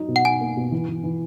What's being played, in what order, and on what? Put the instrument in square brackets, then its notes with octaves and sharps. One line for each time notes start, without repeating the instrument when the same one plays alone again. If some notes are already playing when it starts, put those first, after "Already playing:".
Already playing: [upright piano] F#3 D#4
B2
[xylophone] F#5
[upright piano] D#4 [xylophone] G#5
[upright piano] A#3
B2
E3
E3
E3